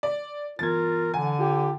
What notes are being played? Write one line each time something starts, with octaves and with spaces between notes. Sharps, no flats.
D5
G2 E3 B3 F4 A#4 G#6 A6
D3 E3 F#5 G#5 A#5
F4 G4 G5